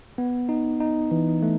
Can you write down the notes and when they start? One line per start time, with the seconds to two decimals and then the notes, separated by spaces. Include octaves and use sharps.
0.18 B3
0.49 D#4
0.80 D#4
1.11 E3
1.42 A3